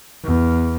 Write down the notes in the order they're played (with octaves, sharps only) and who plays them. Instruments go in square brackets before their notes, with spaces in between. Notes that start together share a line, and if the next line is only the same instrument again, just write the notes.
[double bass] E2